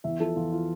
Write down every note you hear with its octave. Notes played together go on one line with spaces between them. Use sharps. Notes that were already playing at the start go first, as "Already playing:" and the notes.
E2 E5
F3 A4
E2 F4
F4